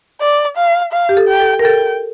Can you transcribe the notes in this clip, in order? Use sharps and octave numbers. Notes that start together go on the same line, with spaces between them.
D5
F5
F5
G4
A4
G5
A4
A#4
A4 G5